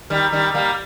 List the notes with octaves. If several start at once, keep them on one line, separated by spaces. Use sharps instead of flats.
D#3 G3
D#3 G3
G3 A#3